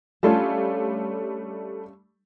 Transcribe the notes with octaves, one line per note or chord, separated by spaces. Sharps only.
G3 A3 C#4 D4 F4 A4